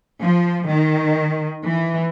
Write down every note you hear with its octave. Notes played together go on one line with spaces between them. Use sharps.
F3
D#3
E3